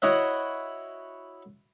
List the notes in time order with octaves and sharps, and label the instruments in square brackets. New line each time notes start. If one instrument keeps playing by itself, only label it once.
[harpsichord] E4 F#4 C#5 D#5 E5